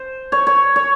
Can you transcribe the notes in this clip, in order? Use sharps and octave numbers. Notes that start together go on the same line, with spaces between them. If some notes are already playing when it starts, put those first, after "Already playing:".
Already playing: C5
C#5
C#5
C#5